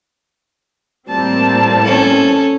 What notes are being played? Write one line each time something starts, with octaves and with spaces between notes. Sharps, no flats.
A2 G3 A#3 C4 A5
C#4 A4